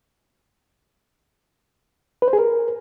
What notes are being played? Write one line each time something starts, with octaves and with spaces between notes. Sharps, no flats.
B4
C5
G#4
A#4